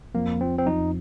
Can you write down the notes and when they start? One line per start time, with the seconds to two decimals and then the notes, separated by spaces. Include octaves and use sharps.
0.14 F2 A#3
0.40 F3 C4
0.59 C4
0.66 F2 D#4